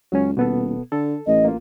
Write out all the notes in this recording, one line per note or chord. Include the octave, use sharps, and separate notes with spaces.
C#2 F#3 C#4
D#1 B2 B3 A4
D3 A4
A1 D#5
A#3 F4